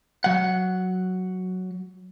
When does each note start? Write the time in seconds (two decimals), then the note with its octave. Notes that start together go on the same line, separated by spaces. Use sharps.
0.24 F#3 F#5